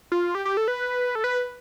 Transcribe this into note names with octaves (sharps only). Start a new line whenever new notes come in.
F4
G4
G4
A4
B4
A4
B4